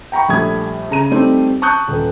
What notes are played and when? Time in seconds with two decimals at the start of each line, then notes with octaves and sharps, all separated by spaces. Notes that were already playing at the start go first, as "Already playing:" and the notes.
0.12 G5 A#5 B5 C#6
0.29 A#1 G3 A3 B5 D#6 G#6
0.91 C#3 A#5 D#7
1.11 G3 A3 C4 D#4
1.62 A5 C#6 D#6 F#6 G6
1.88 D#1 B4